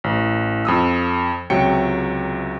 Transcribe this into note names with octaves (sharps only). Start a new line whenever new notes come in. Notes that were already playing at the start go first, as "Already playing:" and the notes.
A1
F2 D#6 E6
C#2 C3 F#3 G5 C#7